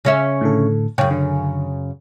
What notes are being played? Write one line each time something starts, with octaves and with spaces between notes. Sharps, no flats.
C#3 C#4 E5
A2 D3 A4
F#2 C#3 C#5 G5
D3